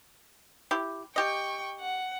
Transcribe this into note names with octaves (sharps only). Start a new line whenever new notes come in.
E4 G4
G4 D#5 G5 C#6
F#5